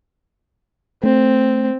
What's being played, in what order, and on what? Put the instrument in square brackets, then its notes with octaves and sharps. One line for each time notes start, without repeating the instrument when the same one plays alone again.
[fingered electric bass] A3 [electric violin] C4